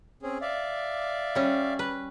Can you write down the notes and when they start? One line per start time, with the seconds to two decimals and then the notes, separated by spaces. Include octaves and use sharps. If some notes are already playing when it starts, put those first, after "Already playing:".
0.23 C4 C#4 G#4
0.41 D5 E5 F5
1.35 G3 C#4
1.79 B4